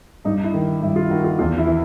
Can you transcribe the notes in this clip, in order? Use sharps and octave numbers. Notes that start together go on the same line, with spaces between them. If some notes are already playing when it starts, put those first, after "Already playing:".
G2 D#4
E4
D#3
G2 E4
F4
D#3 F#4
F4
E2 F4
E4
E3